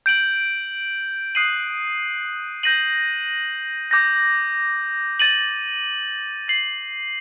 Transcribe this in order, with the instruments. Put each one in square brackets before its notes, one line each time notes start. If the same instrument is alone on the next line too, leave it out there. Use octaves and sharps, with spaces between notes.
[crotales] G6 D7 F#7
D#6 F#6 C7 D#7 F#7
G6 A#6 D#7 F#7
D6 G6 A#6
A6 D#7 F#7
A6 C7 F#7